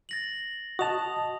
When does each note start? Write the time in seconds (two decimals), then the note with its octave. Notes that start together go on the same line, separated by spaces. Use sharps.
0.09 A6 A#6 F#7
0.79 F#4 D#5 A5 D#6 F7